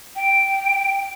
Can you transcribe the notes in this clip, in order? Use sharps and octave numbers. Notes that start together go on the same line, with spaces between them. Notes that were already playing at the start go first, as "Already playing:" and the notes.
G5